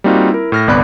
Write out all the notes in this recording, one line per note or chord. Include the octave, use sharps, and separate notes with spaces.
G3 A#3 C4 D#4 F4 F#4
E4 A#4
A2 F6 A#6
G1 C2 B3 D5 B5 F#6